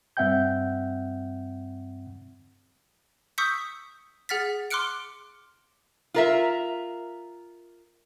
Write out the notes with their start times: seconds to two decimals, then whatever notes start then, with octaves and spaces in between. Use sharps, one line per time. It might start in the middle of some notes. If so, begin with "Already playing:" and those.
0.17 G2 C4 E5 F#5 G5 G6
3.38 C#6 D#6 E6 G6 B6 C#7
4.29 G#4 F#5 F6 A6 B6
4.70 C6 D6 F6 F#6 C#7 D7
6.14 F4 A#4 E5